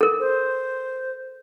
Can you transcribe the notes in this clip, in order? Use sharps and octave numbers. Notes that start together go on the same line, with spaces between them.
A4 A#4
C5